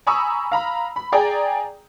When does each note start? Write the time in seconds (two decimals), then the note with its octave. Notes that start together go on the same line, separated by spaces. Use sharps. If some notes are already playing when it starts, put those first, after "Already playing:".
0.07 G#5 A#5 B5 C#6 D#6 E6
0.52 F5 A#5 B5
0.96 B5
1.12 G#4 D5 G5 A#5